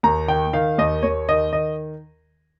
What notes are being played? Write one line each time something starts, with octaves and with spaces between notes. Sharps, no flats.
D#2 A#5
D#3 G5
D#3 F5
D#2 D#5
D#2 C#5
D#3 D#5
D#3 D#5